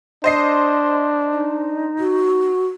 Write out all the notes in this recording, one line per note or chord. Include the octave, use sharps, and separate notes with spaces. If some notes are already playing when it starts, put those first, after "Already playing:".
D4 C5 D#5 C6 C7
D#4
F#4